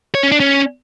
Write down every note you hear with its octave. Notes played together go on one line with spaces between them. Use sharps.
C#5
C#4
D4
C#4